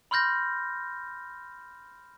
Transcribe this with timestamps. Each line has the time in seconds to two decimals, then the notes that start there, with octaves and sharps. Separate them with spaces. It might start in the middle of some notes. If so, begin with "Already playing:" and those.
0.11 B5 C6 F6 G6 A#6